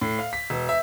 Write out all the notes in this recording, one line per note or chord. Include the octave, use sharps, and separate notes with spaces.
A2
F5
B6
E1
E5